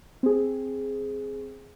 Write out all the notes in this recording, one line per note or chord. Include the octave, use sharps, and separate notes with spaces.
C4 G#4